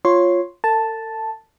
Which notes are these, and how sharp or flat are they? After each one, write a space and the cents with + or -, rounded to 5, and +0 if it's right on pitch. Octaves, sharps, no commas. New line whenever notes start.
F4 +0 C#5 -10 C6 +0
A4 +45 A5 +0